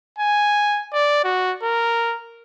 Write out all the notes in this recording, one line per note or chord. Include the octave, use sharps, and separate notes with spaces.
G#5
D5
F#4
A#4